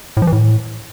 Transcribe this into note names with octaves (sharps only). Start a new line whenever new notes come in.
A2
F3
E3
A2